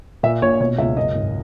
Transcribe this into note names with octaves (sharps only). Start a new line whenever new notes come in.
A#2 E5
A#1 C#5
B2 C#5
C#2 E5
F#2 D#5
G#1